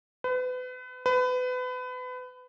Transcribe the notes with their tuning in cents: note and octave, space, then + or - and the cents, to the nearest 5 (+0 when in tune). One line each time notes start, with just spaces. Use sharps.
B4 +35
B4 +30